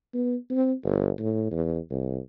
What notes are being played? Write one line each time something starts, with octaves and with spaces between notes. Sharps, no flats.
B3
C4
G1
A2
E2
C2